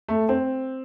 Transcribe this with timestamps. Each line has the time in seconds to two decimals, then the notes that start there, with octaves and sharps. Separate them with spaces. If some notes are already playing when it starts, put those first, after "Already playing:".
0.09 A3
0.29 C4